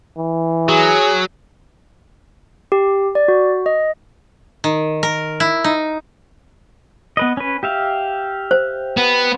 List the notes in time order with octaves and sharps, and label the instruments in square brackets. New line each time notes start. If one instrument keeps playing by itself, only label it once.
[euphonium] E3
[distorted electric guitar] F#3 [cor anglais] G#4
[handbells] G4
D5
F#4
D#5
[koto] D#3
A#4
E4
D#4
[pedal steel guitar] B3 B4 D#5
C#4 B4
G4 E5 F5
[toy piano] C5
[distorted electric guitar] B3